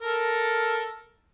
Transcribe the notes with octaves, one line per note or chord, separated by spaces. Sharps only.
A4 A#4